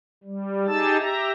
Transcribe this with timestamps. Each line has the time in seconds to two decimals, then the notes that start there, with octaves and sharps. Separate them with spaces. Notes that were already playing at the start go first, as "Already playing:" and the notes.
0.24 G3
0.67 D#4 G4 G#4 A5 E6 A6
0.98 G4 E5 A#5